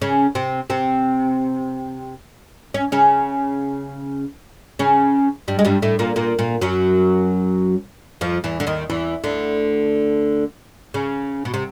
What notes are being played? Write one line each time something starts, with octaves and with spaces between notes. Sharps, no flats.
C#3 C#4
C3 C4
C3 C4
C#4
C#3 C#4
C#3 C#4
G2 G3
G#3
G2 G3
A2 A3
A#2 A#3
A#2 A#3
A#2 A#3
F#2 F#3
F2 F3
E2 E3
D3
D#2 D#3
E2 E3
D2 D3
C#3
B2
C3